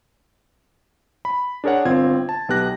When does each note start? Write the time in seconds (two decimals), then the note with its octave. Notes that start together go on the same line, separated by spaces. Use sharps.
1.25 B5
1.64 D4 G#4 A#4 C#5 F#5
1.85 G1 C4 F4 G#6
2.29 A5
2.49 B1 B3 G4 F#6 A#6